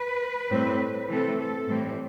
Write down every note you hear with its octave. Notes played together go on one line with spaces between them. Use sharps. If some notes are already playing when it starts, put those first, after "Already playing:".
Already playing: B4
A2 G3 C4
C3 E3 A3 C4 A4
A4
A2 E3 G3 C4